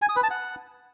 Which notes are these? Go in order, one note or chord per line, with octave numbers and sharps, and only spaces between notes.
G#5
D#6
B4
A5
F#5